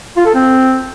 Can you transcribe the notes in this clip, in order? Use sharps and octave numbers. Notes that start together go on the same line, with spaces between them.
F4
A4
C4